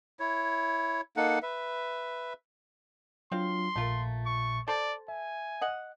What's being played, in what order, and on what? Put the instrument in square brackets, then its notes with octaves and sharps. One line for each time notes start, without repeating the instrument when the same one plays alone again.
[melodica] E4 C#5
A#3 D#4 A4 F#5
B4 E5
[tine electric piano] F#3 D4 F4 [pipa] C4 F5 [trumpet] C6
[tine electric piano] A#1 A#2 [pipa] A3 F4 A#4
[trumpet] C#6
[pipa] A4 C5 A5 [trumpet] D5
[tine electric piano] E5 [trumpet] G#5
[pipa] D#5 F#5